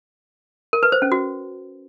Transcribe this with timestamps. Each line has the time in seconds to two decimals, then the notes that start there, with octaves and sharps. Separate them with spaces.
0.73 A#4
0.83 B4
0.92 C5
1.02 C#4
1.12 F#4